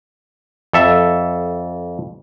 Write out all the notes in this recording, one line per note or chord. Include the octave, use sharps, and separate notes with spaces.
F2 A4 E5